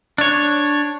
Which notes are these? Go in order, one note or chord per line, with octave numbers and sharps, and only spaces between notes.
D4 C#5